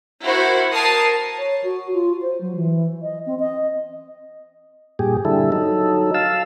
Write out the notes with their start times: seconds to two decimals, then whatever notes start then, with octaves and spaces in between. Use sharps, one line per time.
0.23 E4 F#4 A#4 C5
0.73 A#4 A5 D#6 C7
1.37 C#5
1.63 F#4
1.93 F4
2.21 C5
2.40 F#3
2.55 E3
3.02 D#5
3.26 C4
3.39 D#5
4.99 G2 A#2 G4 G#4
5.25 D3 G3 E4 A4
5.52 F#3 D#4 A4
6.14 F5 A5 E6